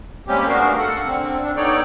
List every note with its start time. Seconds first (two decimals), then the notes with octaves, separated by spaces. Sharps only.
0.28 G3 G#3 A#3 C4 C#4 G4
0.47 A3 B3 D4 F#4 A#4 F5
0.78 A4 F#5
1.06 D3 C4
1.43 D4
1.57 B3 D#4 A4 C#5 D5 G5